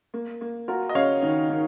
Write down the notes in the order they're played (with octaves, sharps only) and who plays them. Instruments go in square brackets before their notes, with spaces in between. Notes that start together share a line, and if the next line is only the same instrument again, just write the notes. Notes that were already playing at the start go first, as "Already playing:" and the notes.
[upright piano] A#3
A#3
[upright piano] F4 [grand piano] F#4 A#4
[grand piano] D#5
[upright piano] C#3 [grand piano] C#5 F5
[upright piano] D#3
D#3